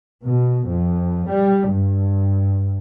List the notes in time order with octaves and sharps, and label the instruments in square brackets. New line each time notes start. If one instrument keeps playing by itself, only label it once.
[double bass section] B2
F2
G3
G2